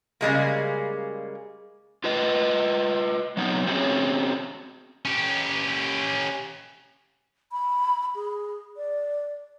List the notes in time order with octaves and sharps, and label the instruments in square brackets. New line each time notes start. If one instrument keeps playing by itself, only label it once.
[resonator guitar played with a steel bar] C#3 G3 G#3 A#3
[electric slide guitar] F4 B4 D#5
F#3 B3 C4 D#4
C4 C#4 F#4 G#4 C#5
[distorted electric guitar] C#4 G4
[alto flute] B5
G#4
D5